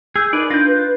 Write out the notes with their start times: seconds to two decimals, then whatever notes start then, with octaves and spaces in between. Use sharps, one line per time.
0.16 G#4 E6 G6
0.33 D#4 A#4 B4 D5 D#5 D#6
0.50 D4 F4 G6 A#6
0.67 B4